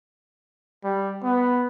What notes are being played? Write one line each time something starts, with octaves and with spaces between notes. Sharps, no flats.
G3
B3